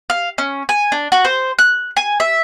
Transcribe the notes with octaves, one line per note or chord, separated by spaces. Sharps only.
F5
C#4
G#5
D4
F#4
C5
F#6
G#5
E5